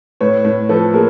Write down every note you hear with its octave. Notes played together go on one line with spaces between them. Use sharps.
A2 B4 C#5
A2
F3 A4 B4
A#3 G#4 A#4